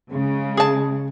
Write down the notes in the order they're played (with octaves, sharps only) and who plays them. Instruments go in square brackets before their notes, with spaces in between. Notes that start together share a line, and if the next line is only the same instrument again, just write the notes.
[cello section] C#3 G#3
[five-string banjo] G#4 A5